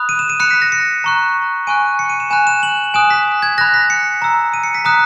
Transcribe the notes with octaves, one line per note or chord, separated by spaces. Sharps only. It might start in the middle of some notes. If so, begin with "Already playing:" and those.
Already playing: B5 D#6 F#6
D#7
E7
D#7
B5 F#6 C#7
B6
A#6
C#7
A#5 C#6 F#6
G#5 C#6 F#6 D#7
C#7
D#7
E7
G#5 B5 F#6 E7
E7
F#7
G#5 D#6 F#6 E7
B6
G#6
B5 F#6 A#6
B6
C#7
A#5 E6
D#7
C#7
B6
A#5 D#6 F#6 B6